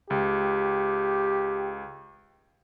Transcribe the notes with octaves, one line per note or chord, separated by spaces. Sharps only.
C#2 G4